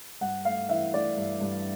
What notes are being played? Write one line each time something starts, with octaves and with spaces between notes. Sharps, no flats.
G2 F#5
A3 F5
E3 E5
A3 D5
G2
G2